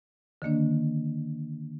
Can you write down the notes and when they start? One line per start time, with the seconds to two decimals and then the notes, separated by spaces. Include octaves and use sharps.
0.42 D3 D#3 A#3 D4